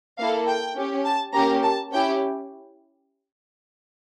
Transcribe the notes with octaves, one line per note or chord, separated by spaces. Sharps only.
A#3 E4 A4 F5
G5
C#4 G4
A5
A#3 C#4 G4 A#5
A5
C#4 E4 G4 G5